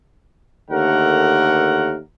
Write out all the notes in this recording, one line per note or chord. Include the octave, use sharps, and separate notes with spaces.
D#2 D3 A3 A#4 F#5